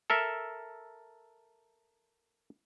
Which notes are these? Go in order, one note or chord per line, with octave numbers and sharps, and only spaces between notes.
A4 A#4 E5